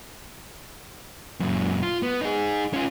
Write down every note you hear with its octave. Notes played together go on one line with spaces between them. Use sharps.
F#2 A#2
F4
B3
D#4 G#4
C#4 F4